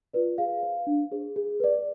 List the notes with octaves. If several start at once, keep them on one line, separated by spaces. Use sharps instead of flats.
F4 B4 D5
G#4 F5
C5
D4
G#4 C5
G#4
B4 D5